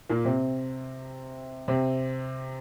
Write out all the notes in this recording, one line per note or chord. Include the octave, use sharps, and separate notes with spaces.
A#2 A#3
C3 C4
C3 C4